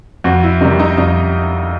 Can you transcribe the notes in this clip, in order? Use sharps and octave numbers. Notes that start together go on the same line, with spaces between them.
F2 F#4
E4
C3 D#3 G3 D#4
D#4
F2 D#4